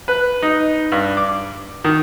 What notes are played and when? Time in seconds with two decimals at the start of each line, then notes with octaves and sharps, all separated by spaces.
0.08 B4
0.43 D#4
0.92 G2
1.17 D6
1.84 D#3